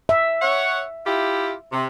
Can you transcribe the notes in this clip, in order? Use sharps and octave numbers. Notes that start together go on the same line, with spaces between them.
E5
C#5 F#5
E4 F4 G4
C3